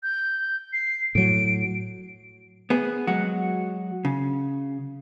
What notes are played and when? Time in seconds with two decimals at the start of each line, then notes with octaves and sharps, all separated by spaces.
0.03 G6
0.73 C7
1.15 A2 F#3 D7
2.70 B3 G#4
3.07 F#3 G#3 F#4
4.05 C#3